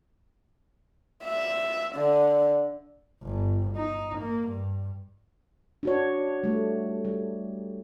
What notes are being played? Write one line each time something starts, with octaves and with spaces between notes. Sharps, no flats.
E5
D3
G1
D#4
A#3
G2
D4 F#4 C#5
G3 A3
G3